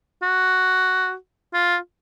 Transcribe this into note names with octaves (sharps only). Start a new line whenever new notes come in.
F#4
F4